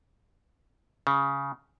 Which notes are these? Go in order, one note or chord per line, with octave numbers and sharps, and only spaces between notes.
C#3